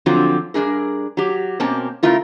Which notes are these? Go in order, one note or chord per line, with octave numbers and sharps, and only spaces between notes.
D3 F3 F#3 C4 F4
G2 E3 D4 G#4 A#4
F#3 G4
B2 A#3 C4 C#4 A5
C#3 A3 E4 F4 A#4